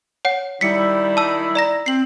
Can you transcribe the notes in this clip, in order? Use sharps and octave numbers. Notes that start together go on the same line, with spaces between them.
C#5 F#5
D#3 G3 E4 B6 C#7
A5 E6
D5 A#5 A#6
C4 C7 F#7